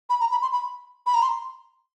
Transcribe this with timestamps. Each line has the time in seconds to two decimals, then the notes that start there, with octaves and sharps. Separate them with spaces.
0.10 B5
0.20 A#5
0.31 B5
0.42 C6
0.53 B5
1.06 B5
1.14 A#5
1.22 C6